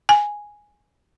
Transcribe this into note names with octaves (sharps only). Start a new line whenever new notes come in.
G#5